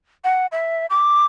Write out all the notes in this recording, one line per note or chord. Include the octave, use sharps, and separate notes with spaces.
F#5
E5
D6